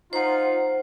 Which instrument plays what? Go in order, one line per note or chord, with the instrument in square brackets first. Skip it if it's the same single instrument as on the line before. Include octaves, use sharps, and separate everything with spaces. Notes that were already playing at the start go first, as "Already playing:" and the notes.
[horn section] D#4 F4 [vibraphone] C5 F#5